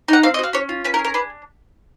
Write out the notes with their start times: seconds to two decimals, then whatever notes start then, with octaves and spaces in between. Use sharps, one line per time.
0.08 D#4 F#5
0.23 C4 F5
0.34 D#5
0.39 F#4 F5
0.53 C#4 C#5
0.69 F4
0.84 C#4 B4
0.94 A#4
0.99 G#4
1.05 A#4
1.14 D4 B4